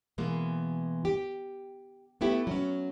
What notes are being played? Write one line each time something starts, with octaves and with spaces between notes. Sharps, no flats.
B2 E3 G#3 A#3
G4
A3 B3 E4 G4
F#3 C#4